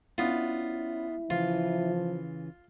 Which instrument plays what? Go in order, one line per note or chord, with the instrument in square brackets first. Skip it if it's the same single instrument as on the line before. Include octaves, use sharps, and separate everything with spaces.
[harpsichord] B3 F4 [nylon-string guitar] C#4 D4 [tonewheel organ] E4
[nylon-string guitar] C#3 E3 [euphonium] F3 [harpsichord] F4